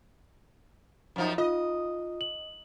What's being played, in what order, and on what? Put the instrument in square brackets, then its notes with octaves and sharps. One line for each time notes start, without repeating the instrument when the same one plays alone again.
[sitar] F#2 F3 D#4
[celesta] F4 [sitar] D#5
[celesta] F#7